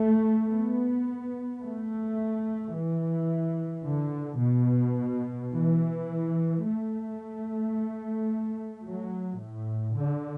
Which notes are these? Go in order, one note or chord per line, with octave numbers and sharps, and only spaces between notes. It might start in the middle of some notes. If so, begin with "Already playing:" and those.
Already playing: A3
B3
A3
E3
D3
B2
E3
A3
F#3
A2
D3